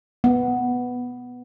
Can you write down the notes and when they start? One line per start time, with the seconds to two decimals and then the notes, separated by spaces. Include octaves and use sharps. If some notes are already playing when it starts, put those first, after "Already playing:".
0.24 B3